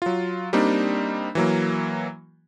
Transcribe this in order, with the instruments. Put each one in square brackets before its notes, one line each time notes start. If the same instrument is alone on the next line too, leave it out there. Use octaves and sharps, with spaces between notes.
[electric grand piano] F#3 F4
G3 A#3 C4 D4 D#4
E3 F#3 A#3